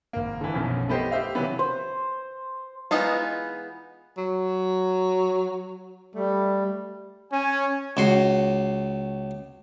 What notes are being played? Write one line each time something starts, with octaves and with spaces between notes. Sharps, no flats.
G#1 A#3
D3 E3
B1 F#2 B2 F3
A3 B3 G4 C5 D#5
G4 C5 E5 F5
C3 E3 F#3 B3
C5
E3 G#3 B3 D#4 F4
F#3
G3 A3
C#4 G#5
C#2 F#4 C6